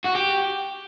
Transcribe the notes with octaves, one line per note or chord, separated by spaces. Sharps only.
F#4
G4